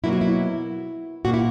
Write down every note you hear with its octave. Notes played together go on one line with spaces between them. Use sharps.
B2 F#3 A#3 E4
F#4
E4
A#2 A#3 F#4
E4